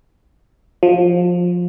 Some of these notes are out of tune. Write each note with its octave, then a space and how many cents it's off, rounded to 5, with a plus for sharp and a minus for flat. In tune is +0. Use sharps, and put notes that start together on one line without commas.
F3 +20